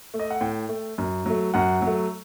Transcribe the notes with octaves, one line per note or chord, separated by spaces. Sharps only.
A3
D#5
F#5
A2 G5
A3
F#2
F#3 A3
F#2 F#5
F#3 A3